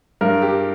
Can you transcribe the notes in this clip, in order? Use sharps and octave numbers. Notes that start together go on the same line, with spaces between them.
G2 A#4
G4